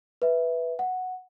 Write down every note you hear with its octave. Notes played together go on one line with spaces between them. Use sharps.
B4 E5
F#5